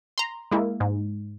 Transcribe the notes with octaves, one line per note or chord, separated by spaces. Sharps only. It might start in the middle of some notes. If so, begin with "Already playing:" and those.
A#5 C6
G#3 A#3 E4
G#2